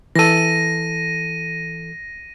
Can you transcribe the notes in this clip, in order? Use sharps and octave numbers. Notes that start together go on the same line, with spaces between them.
E3 A4 A#6 D#7